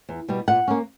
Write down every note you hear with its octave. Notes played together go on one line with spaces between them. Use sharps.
E2
B2 G3 B3
A#2 F#5
A#3 C#4